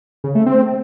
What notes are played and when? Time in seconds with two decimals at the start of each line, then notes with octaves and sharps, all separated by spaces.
0.24 C#3
0.35 A3
0.46 C4